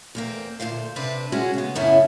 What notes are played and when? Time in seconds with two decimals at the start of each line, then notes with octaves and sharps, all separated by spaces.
0.15 E2 A#3 C4
0.60 D2 G2 A#2 C5 F5
0.96 C3 C4 D4 B4
1.32 G#3 C#4 F#4
1.54 C#3 B3
1.75 F#2 A2 C#3 B3 C#4 E4